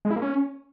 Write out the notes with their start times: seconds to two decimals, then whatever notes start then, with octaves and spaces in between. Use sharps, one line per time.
0.05 G#3
0.11 E4
0.16 A#3
0.22 C#4